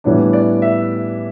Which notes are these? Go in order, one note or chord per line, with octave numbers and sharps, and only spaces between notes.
A2 E3 G3 B3 D4 C#5
D5
E5